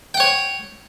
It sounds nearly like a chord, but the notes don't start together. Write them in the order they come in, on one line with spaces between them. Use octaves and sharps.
G5 F#5 C#5